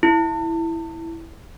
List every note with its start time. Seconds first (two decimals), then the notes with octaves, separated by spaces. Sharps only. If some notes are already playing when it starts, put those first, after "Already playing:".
0.03 E4